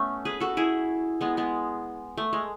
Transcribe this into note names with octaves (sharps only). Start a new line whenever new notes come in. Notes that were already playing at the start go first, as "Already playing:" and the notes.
Already playing: A3 B3 C#4
G#4 B4
F#4 A4
E4 G#4
G#3 B3
G#3 B3
A3
G#3